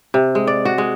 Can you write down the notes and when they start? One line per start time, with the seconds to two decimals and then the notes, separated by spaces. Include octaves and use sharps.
0.14 C3
0.35 G#3
0.47 D5
0.65 F#4
0.78 G#3